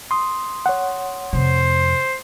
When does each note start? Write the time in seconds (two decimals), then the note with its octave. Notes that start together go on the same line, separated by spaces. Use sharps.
0.11 C6 D#6
0.66 C#5 F#5
1.33 F2 C3 C5